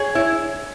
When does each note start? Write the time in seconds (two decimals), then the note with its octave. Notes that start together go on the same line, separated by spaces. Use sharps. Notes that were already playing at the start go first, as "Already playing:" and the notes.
Already playing: G#4 C#5
0.15 E4 C#5